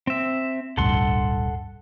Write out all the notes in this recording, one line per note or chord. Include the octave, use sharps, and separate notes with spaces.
C4 E5
D1 B1 G2 A4 F#5 C6